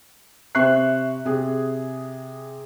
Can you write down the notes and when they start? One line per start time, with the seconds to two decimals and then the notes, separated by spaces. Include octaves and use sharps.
0.55 C3 C4 E5 C#6 F#6 C7
1.25 C3 G#4